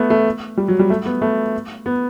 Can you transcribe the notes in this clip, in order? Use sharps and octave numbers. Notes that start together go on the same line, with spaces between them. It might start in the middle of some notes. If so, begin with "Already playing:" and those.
Already playing: A3 B3
A3
G3
F#3
G3
A3
B3
A3
B3